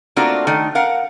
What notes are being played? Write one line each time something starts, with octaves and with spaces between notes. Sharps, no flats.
A3 A#3 C4 D4 F4 F#4
D#3 A3
A#4 F5 F#5